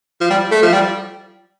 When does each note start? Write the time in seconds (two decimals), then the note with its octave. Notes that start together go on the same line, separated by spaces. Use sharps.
0.21 F3
0.30 G3
0.51 A3
0.62 F3
0.72 G3